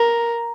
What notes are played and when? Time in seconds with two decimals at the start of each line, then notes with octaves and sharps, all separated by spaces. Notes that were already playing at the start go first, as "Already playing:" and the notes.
Already playing: A#4